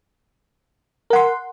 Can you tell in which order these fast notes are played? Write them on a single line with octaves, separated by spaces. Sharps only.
A#4 F#5 C6